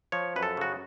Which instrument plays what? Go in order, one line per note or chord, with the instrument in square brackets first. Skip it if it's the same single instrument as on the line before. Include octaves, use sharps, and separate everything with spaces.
[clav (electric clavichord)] F3 C#5
F#2 B4
A4
C#3 F#4